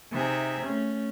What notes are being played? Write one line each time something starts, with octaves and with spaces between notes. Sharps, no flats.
C3 D#4 G#4 E5
A3 C#4